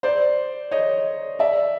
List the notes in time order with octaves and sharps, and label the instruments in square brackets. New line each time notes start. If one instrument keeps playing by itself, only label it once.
[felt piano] C5 D5
C#5 D#5
D5 E5